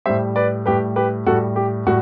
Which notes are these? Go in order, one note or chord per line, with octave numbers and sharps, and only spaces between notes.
A2 G3 C5 E5
B4 D5
A2 G3 G4 B4
G4 B4
A2 G3 F#4 A4
G4
A2 G3 F#4